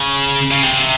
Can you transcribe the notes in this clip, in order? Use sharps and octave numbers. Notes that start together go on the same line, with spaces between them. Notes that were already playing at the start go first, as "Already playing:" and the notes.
Already playing: C#3
C#3
C3